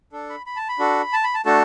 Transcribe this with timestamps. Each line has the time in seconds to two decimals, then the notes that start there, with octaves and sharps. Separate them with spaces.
0.12 D4 A4
0.29 B5
0.46 B5
0.56 A5
0.69 B5
0.79 D4 F#4 A4
1.13 A5
1.24 B5
1.35 A5
1.45 A3 D4 F#4 A4 A5